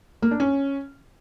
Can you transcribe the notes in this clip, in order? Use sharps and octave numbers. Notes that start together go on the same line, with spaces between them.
A#3
D4
C#4